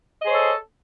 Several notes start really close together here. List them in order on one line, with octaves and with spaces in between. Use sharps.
D#5 G#4 C5 C#5 A4